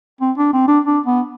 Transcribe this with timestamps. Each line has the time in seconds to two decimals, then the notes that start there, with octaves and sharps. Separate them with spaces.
0.21 C4
0.38 D4
0.53 C4
0.68 D4
0.85 D4
1.06 B3